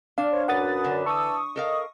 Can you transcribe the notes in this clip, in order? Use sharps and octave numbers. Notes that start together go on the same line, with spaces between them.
D4 F5
C5 C#5
F#2 B4 F#5 D#6 A6
D3
E3 A5 C#6 D#6 E6
A4 A#4 D#5 F5